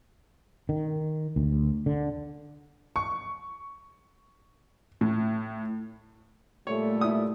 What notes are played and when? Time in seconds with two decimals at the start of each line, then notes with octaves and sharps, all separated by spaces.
0.69 D#3
1.36 D2
1.86 D3
2.96 C#6
5.01 A2
6.67 A#2 G3 A3 C#5
7.01 E4 D#6